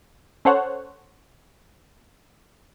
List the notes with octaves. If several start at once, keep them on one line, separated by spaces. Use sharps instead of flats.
C#4 A4 C5 C#5 F#5